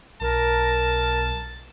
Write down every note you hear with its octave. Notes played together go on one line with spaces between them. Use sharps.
B1 A#4 A5